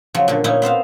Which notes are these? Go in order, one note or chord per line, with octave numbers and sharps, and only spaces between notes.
C#3 F3 F#3
A#2 D3
A#2 C#4 D#4 E4
B3 C4 C5 F5